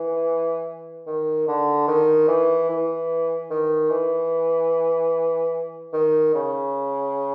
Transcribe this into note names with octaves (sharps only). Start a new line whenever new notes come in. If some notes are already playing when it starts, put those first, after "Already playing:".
Already playing: E3
D#3
D3
D#3
E3
E3
D#3
E3
D#3
C#3